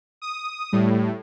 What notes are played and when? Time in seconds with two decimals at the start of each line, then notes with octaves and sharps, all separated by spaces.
0.22 D#6
0.72 A2 G3